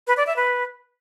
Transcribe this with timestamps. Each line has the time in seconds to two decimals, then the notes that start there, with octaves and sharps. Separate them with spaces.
0.07 B4
0.17 D5
0.27 E5
0.36 B4